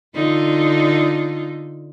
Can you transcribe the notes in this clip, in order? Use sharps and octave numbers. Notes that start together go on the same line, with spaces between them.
D3 D#4 F4